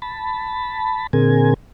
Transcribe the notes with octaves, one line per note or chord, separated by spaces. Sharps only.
A5 B5
A#2 D3 C4 G#4 A#4 G#5